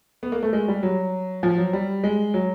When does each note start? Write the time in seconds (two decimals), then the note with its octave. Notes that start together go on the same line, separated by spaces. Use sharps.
0.23 B3
0.32 A#3
0.43 A3
0.53 G#3
0.68 G3
0.83 F#3
1.43 F3
1.58 F#3
1.73 G3
2.04 G#3
2.34 F#3